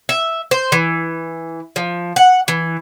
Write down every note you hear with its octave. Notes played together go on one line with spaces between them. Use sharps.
E5
C5
E3
F3
F#5
E3